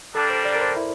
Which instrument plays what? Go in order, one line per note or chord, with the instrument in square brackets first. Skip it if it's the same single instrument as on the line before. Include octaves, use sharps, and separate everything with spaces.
[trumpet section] G3 A#3 D4 [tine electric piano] A4
[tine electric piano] C5
D5
A#4
C5
E4